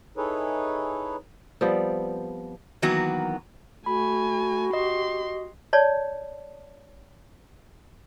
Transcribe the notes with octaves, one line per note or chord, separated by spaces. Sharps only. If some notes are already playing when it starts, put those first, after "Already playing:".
D#4 E4 G#4 A4 B4 C#5
F3 G3 B3 C4
D#3 E3 F#3 A#3 B3 F#4
A3 F#4 G#5 B5
G4 D#5 C6
C#5 D5 A5